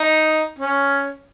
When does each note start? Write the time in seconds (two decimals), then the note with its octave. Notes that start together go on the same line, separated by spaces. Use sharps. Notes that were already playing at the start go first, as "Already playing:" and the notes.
Already playing: D#4
0.59 C#4